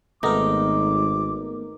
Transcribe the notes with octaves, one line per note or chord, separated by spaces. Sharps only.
G#1 A3 B3 D#4 A#4 D6